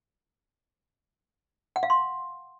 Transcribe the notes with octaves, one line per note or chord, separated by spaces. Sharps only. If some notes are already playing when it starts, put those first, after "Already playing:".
F#5
F5
C6